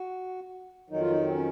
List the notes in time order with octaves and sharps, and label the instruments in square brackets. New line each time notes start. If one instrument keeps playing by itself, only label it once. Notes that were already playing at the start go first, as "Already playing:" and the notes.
Already playing: [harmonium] F#4
F2 D#3 F#3 D#4
F4
D#4
C4
C#4